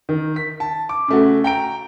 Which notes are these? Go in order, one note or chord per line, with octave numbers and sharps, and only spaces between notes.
D#3
B6
A5
D6
C#3 A3 F#4
G5 A#5 D7